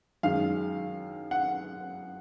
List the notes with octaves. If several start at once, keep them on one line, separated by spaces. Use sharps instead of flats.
F#2 D#3 G#3 F5
F#5